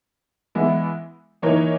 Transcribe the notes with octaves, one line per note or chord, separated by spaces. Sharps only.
E3 G#3 B3 E4
E3 A#3 D#4 A#4 C#5